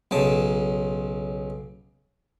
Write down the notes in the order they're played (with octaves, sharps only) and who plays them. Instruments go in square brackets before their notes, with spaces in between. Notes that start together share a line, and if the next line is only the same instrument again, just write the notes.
[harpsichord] B1 C#3 A5